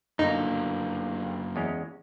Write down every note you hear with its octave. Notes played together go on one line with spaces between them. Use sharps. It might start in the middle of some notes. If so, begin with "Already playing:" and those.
G1 F#2 B2 A#3 D#4
E2 G#3 C#4